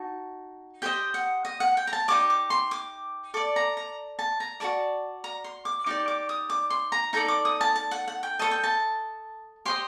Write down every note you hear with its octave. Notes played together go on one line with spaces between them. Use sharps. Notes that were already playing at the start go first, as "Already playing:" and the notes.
Already playing: D#4 F#4 A5
G4 C5 D#5 G5
F#5
D#5
F#5
G5
A#5
A5
D#4 G4 D5 D6
D6
C6
D6
A4 D5 D6
A#5
A#5
A5
A#5
F#4 A#4 D5 A5
A#5
C6
D6
D#4 G4 D5 D6
D6
D#6
D6
C6
A#5
D#4 A4 D5 A#5
D6
D#6
A5
A5
F#5
F#5
G5
A4 C5 D#5 A5
G5
A5
G4 C5 D#5 C6